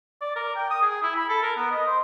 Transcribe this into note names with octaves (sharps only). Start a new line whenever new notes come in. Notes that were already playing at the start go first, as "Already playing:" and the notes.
D5
A#4
G5
D#6
G#4
E4
B5
A4
A#4
B3
D#5
C5